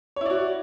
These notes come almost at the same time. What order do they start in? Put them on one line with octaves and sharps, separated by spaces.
C#5 E4 D5 F#4